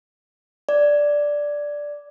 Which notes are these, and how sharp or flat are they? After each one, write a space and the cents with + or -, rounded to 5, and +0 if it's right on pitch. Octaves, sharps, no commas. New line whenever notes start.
D5 -5